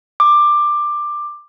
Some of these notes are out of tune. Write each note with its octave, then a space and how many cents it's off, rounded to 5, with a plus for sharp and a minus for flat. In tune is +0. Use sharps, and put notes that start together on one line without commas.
D6 +15